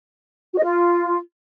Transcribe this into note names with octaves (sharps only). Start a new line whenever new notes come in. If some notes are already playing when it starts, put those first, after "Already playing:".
F#4
D#5
F4